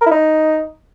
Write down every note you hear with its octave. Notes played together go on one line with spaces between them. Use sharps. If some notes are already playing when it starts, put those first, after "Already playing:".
A#4
E4
D#4